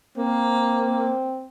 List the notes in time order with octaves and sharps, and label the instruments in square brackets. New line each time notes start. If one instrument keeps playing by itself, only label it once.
[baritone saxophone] A#3 [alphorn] C4